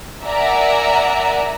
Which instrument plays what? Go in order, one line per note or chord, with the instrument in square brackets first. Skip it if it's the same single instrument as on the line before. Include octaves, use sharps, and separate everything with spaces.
[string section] A#4 D5 E5 F#5 G#5 A#5